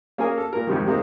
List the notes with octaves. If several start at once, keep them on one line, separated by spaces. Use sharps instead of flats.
A#3 C#4 G#4 A#4 G#5
A4
A#2 A#4
F2 G#2 C3 D#3
C3 D#3 G#3 A#3